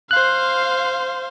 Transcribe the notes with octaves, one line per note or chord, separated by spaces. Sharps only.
C5 F5 F#6